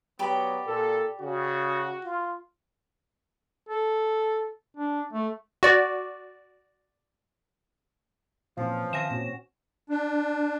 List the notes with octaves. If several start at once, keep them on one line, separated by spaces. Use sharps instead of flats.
F#3 B3 G4 D5 B5
A#2 A4
C#3 F#4
F4
A4
D4
A3
F#4 D5
A#2 E3 F3 C4 C#4
D#3 E5 G#5 A#6 E7
A#2 C4 C#4 F#4
D4